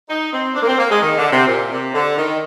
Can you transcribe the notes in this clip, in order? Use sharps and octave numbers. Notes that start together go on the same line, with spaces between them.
D#4
C4
D4
A#3
C4
A#3
G#3
D#3
D3
C3
A#2
C3
D3
D#3